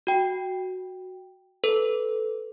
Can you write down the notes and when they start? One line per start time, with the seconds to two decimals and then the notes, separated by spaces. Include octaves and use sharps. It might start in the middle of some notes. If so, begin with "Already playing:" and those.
0.07 F#4 G5
1.64 A4 B4